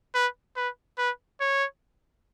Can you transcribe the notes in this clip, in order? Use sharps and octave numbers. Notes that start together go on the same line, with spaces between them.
B4
B4
B4
C#5